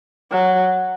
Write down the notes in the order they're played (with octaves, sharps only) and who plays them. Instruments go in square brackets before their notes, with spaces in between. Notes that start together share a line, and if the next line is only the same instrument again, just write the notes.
[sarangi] F#3